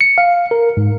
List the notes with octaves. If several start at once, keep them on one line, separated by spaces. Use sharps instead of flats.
C#7
F5
A#4
G#2